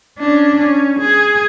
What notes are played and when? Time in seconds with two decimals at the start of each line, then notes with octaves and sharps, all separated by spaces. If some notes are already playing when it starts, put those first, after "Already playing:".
0.18 C#4 D4
0.58 C#4
0.99 G#4